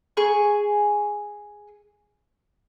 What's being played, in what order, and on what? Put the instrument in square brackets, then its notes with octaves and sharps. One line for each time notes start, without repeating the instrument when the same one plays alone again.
[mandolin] G#4 G#5 C#6